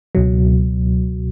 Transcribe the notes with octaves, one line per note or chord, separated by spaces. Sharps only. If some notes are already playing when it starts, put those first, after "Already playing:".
C#2 B2 F#3